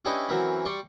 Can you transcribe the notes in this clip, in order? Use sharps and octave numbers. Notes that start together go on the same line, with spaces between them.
C#4 D4 E4 G4 B4 D#5
F#2 E3 C4 A#4 B5
G3 D5 C6 C#6